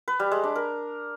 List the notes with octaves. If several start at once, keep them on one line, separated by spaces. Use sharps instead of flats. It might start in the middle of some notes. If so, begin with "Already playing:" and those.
B4
G3
G#3
D4
A#4